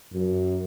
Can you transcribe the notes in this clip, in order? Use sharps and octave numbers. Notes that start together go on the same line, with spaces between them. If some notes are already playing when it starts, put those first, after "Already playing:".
F#2